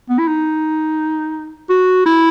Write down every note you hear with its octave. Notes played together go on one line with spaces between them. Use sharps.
B3
E4
D#4
F#4
E4